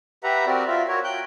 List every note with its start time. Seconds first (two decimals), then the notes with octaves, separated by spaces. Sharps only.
0.24 G4 B4 E5 F#5 A#5
0.47 C4 F#4 A#4 D5
0.68 F4 E5
0.88 F#4 A#4 C#5
1.04 G5 F#6 G6